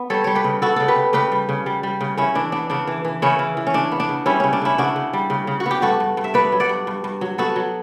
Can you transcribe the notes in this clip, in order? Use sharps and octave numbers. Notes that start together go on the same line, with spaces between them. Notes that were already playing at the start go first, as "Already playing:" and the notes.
Already playing: B3
G3 A4 C#5
G3 C#5
G4 B4
C#3
B3 F#4 A4
C#3 A4
G4 B4
C#3
C#3 G4 B4
G3
C#3
G3
G3
C#3
C#3 C#4 E4
E3 D4
B3 D4
C#3 D4
E3
E3
C#3 C#4 E4
E3
E3
C#4
C#3 D4
B3
D4
C#3
G3 C#4 E4
C#3 C#4
D4
C#3 C#4 E4
C#3 D4 F#4
C#3
G3
C#3
C#3
F#4
B3
G4
G2 F#4 A4
G2
G2
E5
B3 B4 D5
F#3
D5 F#5
G2
G2
G2
F#3
B3 F#4 A4
F#3